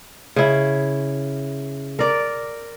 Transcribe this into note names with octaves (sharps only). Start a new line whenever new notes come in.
C#3 E4
A#4 D5